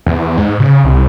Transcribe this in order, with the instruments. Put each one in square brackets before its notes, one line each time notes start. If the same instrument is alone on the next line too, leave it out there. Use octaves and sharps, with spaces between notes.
[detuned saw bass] E2
G#2
C#3
C2